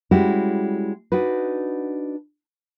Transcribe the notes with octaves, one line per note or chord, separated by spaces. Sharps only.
G3 G#3 C#4 E4 F#4 G4
D4 D#4 F#4 B4